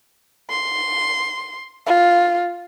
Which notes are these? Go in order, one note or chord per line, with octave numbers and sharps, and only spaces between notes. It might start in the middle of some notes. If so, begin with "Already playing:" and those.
C6
F4